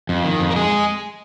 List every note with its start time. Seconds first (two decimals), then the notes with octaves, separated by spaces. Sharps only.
0.09 F2
0.24 D#3
0.40 F2
0.51 A#4
0.56 G#3 G#4